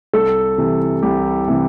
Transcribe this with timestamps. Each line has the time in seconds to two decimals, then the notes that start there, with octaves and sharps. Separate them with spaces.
0.13 C2 A4
0.58 C3 E3
1.03 C2 G4
1.48 C3 E3